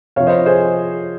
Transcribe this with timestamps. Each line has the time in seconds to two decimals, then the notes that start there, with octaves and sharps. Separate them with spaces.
0.16 C3 F3 C#5 F5
0.27 C5 D#5
0.46 G#4 C5